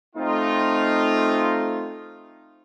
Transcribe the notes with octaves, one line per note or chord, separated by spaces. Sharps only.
A3 C4 D#4 F4